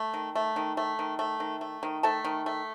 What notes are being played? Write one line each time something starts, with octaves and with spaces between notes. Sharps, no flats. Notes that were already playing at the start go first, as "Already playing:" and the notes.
Already playing: A3
D#3
A3
D#3
A3
D#3
A3
D#3
A3
D#3
A3 A4 A5
D#3
A3